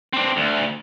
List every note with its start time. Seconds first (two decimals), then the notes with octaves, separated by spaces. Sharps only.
0.13 C4 D4
0.37 D2